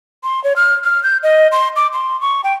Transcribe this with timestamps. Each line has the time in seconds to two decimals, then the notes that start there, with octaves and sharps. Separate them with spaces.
0.23 C6
0.44 C#5
0.56 F6
0.84 F6
1.03 G6
1.23 D#5
1.52 C6
1.76 D6
1.93 C6
2.21 C#6
2.44 G5